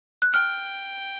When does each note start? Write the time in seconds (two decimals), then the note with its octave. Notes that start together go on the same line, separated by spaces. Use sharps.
0.22 F#6
0.33 G5 F6